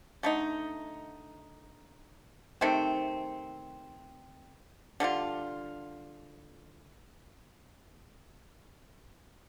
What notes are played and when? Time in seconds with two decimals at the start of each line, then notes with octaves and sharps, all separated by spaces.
0.23 D3 A3 D#4
2.61 C3 D#3 A3 C4
5.00 D3 G3 D4 F4